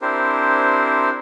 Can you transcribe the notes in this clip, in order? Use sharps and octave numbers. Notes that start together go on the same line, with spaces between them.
C4 D4 E4 G4 A#4 C5